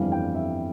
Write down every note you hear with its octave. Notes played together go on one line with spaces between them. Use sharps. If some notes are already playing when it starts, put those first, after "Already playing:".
Already playing: G1 F2 E3 G3 F5
G5
E5